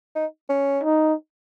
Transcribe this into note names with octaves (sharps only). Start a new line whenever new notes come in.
D#4
C#4
D#4